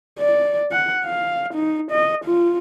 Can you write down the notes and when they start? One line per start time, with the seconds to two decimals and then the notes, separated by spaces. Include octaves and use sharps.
0.19 D5
0.72 F#5
1.05 F5
1.54 D#4
1.91 D#5
2.25 F4